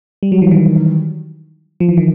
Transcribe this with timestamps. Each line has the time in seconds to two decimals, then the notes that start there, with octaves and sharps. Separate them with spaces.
0.23 G3
0.32 F#3
0.42 E3
0.51 D#3
1.80 F3
1.89 E3
1.97 D#3